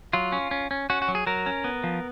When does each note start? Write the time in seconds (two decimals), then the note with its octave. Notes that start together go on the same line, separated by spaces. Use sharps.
0.13 F#3 F4
0.32 C#4
0.51 C#4
0.71 C#4
0.90 C#4 F#4
1.02 F#4
1.08 F#3
1.15 G#4
1.27 F#3 A#4
1.46 C#4
1.64 B3
1.84 F3